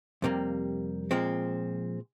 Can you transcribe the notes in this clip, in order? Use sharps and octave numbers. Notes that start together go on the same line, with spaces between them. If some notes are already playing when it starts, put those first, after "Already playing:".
F2 C3 G3 A#3
A#2 F3 G#3 C4